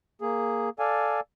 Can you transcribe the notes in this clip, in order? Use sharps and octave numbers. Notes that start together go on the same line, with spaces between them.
A#3 G#4
A4 D5 F5 G#5